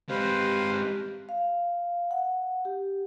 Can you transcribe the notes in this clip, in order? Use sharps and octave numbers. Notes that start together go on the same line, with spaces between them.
G#3 C4 G4 B4 C5 F5
F5
F#5
G4